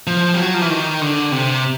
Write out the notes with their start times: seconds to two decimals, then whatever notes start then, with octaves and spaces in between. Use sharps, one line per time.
0.07 F3
0.34 G3
0.39 F#3
0.54 F3
0.62 E3
0.70 D#3
1.01 D3
1.32 C3